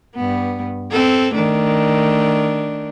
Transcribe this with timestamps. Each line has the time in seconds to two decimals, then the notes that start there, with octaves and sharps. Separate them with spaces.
0.15 G2 B3
0.91 C4 A4
1.34 D#3 A3 D4